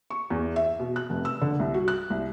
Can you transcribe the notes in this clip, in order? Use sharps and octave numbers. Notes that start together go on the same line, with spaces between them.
C#6
E2
E5
B2
F#6
F1
E6
D3
C2
F#4
F#6
C2